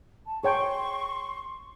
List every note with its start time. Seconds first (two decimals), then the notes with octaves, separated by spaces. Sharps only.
0.27 A5
0.44 G#4 C#5 G5 C6 C#6